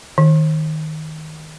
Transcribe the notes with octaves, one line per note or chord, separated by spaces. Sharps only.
D#3